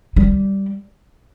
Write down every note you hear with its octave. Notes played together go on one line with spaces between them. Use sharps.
G3